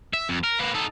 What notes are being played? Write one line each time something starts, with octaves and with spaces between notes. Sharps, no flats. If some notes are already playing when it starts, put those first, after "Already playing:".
E5
F2
A#4
A#3 B4
D#4 A4